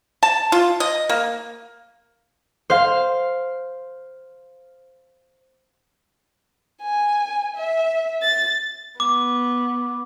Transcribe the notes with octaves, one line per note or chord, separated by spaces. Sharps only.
A5
F4
D#5
A#3
C5 F5
G#5
E5
A6
B3 D6